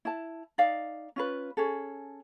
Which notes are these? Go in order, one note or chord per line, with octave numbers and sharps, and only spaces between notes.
E4 A5
D#4 D5 F5
C#4 F4 B4
C#4 G#4 A4